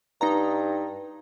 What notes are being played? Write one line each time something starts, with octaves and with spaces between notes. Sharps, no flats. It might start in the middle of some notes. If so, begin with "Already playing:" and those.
G2 D#4 A#5